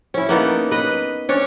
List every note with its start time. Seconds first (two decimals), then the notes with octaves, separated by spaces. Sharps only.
0.14 C#4 E4
0.29 A#3 B3 D#4 A4
0.71 B4 D#5
1.29 C#4 D4 C#5